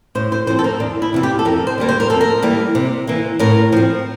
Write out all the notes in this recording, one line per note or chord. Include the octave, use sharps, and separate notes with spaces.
A2 C5
C5
F3 C4 C5
A4
A#4
E2 D4
E4
C3 E3 F4
G4
A4
F2 A#4
C5
D3 G3 A#3
C5
A#4
F2 A4
A#4
E3 G3 A#3
C3
E3 A#3
A2 A#4
F3 C4